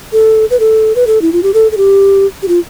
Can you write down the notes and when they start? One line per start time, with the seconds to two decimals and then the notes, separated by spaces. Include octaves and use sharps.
0.12 A4
0.50 B4
0.60 A4
0.96 B4
1.07 A4
1.22 E4
1.33 F4
1.43 G4
1.54 A4
1.72 A4
1.77 G4
2.42 G4
2.48 F4